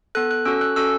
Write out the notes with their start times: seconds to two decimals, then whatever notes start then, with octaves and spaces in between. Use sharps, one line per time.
0.15 B3 A4 F#6
0.31 F#6
0.45 C#4 F#4 A4 E6
0.61 F#6
0.76 C#4 F#4 A4 E6